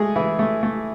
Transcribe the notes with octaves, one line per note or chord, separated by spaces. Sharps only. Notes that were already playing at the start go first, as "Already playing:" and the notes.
Already playing: G#3 A3 G#4
E3 E4
A3
A3